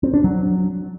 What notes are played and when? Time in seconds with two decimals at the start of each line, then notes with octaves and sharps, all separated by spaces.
0.03 C4
0.14 D4
0.24 F#3